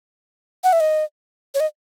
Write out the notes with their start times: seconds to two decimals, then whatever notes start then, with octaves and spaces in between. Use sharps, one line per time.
0.64 F#5
0.73 E5
0.80 D#5
1.54 C#5
1.60 D#5